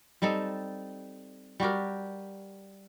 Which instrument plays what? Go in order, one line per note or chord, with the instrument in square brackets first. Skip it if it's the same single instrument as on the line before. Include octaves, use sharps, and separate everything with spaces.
[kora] G3 C4 D#4 A4
G3 F#4 G4 A#4